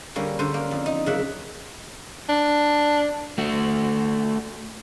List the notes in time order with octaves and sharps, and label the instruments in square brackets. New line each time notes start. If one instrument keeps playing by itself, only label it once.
[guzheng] D3 G3 A#3 C#4
D3 C#4 C5
A#3
F2
D#4
C#3 F#3 A#3 E5 F#5
[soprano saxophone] D4
[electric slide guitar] A3 F#4